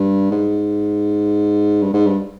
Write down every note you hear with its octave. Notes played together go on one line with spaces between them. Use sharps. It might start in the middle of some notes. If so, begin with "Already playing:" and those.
Already playing: G2
G#2
G2
G#2
G2